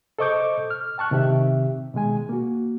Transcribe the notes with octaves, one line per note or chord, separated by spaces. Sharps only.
A4 C5 D#5 C#6 D6 G6
F6
G5 A5 C#6 F#6
C3 D#3 C4 G4 E5
B2 D#3 G#3 G#5
A#3 F#4